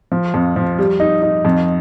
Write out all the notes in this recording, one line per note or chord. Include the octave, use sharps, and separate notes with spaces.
F3
F2
F3
G3
D#4
D#4
F2